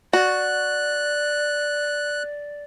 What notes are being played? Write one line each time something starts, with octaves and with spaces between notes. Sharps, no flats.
F#4 D5 F#6